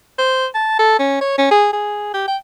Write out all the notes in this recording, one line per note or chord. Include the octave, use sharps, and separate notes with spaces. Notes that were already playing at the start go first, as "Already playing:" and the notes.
C5
A5
A4
C#4
C#5
C#4
G#4
G#4
G4
G5